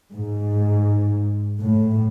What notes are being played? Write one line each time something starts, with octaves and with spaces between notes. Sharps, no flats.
G#2
A2